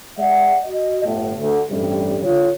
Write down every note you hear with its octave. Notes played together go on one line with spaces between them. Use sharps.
G#3 D5 E5 F#5
F#4 D#5
G1 A2
D2
A1 G2 C3 G3
C2 D3 F4 C#5